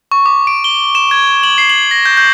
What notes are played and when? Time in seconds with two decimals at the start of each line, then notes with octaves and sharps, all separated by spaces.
0.12 C#6
0.26 D6
0.47 D7
0.64 G7
0.95 E7
1.11 G#6
1.43 F#7
1.58 C7
1.70 F#7
1.91 A#6
2.05 G6
2.17 G6